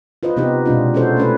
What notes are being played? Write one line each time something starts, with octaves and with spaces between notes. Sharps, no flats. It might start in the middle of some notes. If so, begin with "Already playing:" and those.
F4 B4 C5 D#5
C3 B3 D#4 G4 D#5
B2 G#3 D4 F4
C#4 D#4 F#4 A4 C5
A3 C#4 B4 C#5